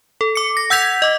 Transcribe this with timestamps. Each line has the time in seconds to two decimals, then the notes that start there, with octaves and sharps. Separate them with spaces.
0.21 A4
0.35 D6 C#7
0.57 A#6
0.70 F#5 E6 G6 G#6 B6 F7
1.02 D#5 D6